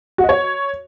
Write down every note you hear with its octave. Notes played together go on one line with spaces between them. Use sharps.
F#4
D#5
C#5